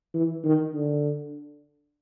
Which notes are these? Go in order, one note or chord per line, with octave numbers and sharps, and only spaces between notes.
E3
D#3
D3